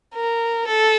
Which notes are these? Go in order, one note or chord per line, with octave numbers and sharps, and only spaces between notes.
A#4
A4